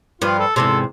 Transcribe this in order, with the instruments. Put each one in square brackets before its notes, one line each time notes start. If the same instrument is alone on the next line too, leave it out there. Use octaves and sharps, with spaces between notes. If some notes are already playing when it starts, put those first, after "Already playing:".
[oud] G2 F3 B4 [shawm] F4
[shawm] A4
[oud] E2 G#2 C3 [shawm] A4